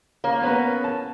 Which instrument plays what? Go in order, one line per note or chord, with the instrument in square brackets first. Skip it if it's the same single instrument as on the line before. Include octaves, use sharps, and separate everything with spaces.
[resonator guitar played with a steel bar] A#3 [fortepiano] C#4
[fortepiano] B3 C#4 B4
A5